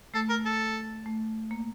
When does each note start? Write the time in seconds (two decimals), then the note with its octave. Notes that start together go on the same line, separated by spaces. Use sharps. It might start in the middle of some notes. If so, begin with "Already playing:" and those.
0.14 A3 A4
0.29 A#4
0.45 A4
1.06 A3
1.51 A#3